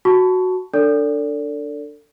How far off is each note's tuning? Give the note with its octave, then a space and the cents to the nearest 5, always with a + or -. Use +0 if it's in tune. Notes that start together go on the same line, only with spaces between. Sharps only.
F#4 +0 A5 +0 C#6 +15
D4 +0 A4 +30 D5 -30